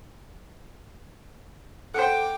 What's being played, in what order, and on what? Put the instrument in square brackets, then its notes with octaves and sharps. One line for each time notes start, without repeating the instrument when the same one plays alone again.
[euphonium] A4 [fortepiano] C5 F#5 [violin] G5 D6